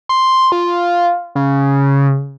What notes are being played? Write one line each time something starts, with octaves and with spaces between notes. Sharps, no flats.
C6
F4
C#3